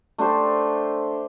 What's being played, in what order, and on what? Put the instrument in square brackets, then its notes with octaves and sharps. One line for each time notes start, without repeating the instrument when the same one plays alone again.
[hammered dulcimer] A3 D4 G4 C5